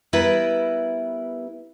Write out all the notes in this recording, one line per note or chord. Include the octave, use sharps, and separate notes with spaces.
G3 B3 E4 A#4 B4